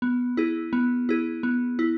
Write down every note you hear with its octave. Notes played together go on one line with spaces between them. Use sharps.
B3
E4 G#4
B3
E4 G#4
B3
E4